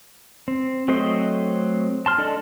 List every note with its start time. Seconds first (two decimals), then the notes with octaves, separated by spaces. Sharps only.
0.48 C4
0.88 F#3 A3 C4 C5 D#5
2.06 A5 C6 F6
2.18 D4 A4 D5 D#5 A5